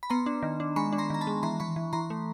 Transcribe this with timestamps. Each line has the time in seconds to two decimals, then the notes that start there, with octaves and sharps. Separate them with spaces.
0.03 B5
0.10 B3 A#5 C6
0.26 D4
0.43 D#3
0.60 D4
0.76 G#3 B5 C#6
0.93 D4
0.98 A#5 C6
1.10 D#3 A#5
1.21 A5 B5
1.27 G#3
1.43 E3 A#5 C6
1.60 E3 B5 C#6
1.76 E3
1.93 E3 A#5 C6
2.10 A3